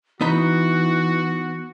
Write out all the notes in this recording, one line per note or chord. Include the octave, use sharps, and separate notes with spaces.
E3 B3 D#4 F#4 B5